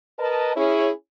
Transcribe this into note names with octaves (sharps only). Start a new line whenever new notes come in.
A#4 B4 D#5 A5
C#4 E4 G#4 C#5